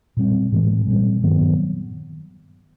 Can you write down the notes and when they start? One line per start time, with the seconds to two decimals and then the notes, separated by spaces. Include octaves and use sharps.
0.17 A#2 G3 C4
0.52 A2 E3 G#3
0.87 A#2 G3 C4
1.23 G2 D#3 F#3 B3